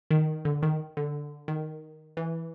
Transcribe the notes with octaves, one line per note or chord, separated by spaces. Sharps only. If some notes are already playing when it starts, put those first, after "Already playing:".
D#3
D3
D#3
D3
D#3
E3